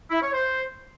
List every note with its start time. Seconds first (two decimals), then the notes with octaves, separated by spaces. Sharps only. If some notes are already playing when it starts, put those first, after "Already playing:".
0.11 E4
0.22 C#5
0.34 C5